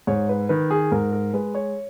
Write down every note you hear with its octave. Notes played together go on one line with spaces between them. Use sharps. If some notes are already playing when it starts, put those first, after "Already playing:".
G#2 C#5
B4
D#3 B4
G#4
G#2 A#4
A#4
G#3 B4
C#5